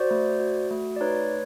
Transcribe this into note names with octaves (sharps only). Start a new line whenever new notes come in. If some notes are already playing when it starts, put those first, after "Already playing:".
Already playing: F#4 C5 D5
A3
F#4
A3
D5
D#4 B4 C#5